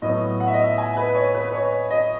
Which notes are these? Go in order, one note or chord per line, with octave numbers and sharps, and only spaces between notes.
A2 F#3 B3 E4 D#5
F#5
E5
D#5
E5
G#5
B4
C#5
B4
B4
C#5
D#5